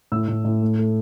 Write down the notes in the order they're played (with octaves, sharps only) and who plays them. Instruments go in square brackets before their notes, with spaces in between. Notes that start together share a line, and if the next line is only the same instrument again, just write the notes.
[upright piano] A2 E6
A2
A2
A3
A3